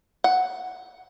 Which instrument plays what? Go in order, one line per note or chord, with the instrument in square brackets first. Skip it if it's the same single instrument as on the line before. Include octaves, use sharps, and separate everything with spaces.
[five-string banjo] F#5